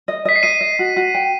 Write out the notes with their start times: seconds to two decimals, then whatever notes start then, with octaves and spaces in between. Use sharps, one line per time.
0.08 D#5
0.25 D#5 B6
0.36 C7
0.43 D#5 D#7
0.61 D#5
0.79 F#4
0.96 F#4
1.14 G5